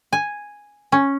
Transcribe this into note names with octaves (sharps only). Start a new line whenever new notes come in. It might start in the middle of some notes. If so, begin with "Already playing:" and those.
G#5
C#4